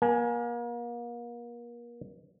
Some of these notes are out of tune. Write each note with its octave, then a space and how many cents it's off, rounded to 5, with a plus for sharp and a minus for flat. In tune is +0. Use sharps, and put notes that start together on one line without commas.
A#3 +35 G#5 +0